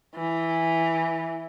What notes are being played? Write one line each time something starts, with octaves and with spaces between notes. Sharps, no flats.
E3